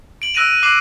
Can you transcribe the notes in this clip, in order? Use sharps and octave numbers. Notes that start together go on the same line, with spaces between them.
D7 F#7
E6 F#6 A#6 D7 D#7 F7
D#7
D6 F#6 C7 E7 F#7